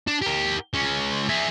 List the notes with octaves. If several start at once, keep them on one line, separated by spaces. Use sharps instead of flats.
D4
G4 A#4
G#3 C#4
G#4 E5